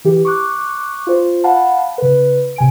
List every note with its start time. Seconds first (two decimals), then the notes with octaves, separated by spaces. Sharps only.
0.05 E3 G4
0.25 C#6 D6 F#6
1.07 F4 C5
1.44 F5 F#5 A5 B5
1.98 C#3 B4
2.56 C3 G#5 D7